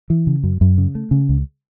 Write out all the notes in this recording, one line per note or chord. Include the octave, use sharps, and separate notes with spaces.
E3
C#3
F#2
F#2
C#3
A3
C#3
C#2